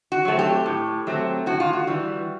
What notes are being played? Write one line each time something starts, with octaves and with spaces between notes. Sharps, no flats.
F#4
F#3 A3 C4
G4
A2
F#3 A3 C4
A2 F#4
F4
F#4
E3 G3